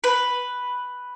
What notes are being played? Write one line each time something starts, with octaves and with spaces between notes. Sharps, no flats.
B4